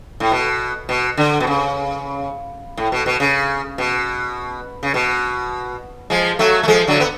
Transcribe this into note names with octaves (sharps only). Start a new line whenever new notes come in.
A2
B2
B2
D3
B2
C#3
A2
B2
B2
C#3
B2
C#3
B2
F3 G#3
F#3 A3
A3
F3 G#3
D3 F#3
B3